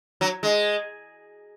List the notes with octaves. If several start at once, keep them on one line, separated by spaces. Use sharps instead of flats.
F#3
G#3